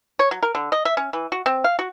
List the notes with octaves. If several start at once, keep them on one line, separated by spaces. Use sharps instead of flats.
C#5
F#3
A#4
D3
D#5
E5
C#4
E3
F#4
C4
F5
F#4